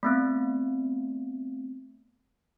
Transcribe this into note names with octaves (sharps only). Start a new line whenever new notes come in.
A3 B3 C4